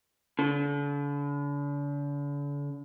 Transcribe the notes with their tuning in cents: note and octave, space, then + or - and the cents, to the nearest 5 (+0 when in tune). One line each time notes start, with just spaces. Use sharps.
D3 -40